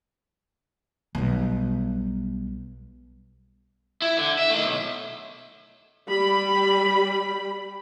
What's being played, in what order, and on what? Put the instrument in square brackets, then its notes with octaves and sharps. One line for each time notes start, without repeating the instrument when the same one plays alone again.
[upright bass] B1 G3
[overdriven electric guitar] E4
D3
E5
D#3 A3
B1
[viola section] G3 B5